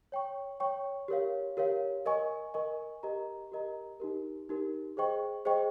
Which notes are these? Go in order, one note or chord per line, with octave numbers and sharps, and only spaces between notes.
C#5 G5 C#6
C#5 G5 C#6
G4 A#4 C#5 F5
G4 A#4 C#5 F5
A#4 D#5 G#5 C#6
A#4 D#5 G#5 C#6
G4 A#4 D#5 A#5
G4 A#4 D#5 A#5
D#4 G4 A#4
D#4 G4 A#4
G#4 C5 D#5 G5 C#6
G#4 C5 D#5 G5 C#6